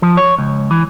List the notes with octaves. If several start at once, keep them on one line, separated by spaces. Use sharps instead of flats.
F3
C#5
C#2
E3